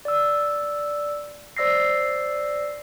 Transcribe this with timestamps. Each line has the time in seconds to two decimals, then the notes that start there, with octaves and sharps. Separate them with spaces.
0.05 D5 E6
1.57 C5 D5 E6 A#6 C7